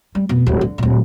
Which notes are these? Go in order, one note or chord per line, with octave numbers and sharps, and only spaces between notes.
G3
F1 B2
D1 A1
D3
D1 A#2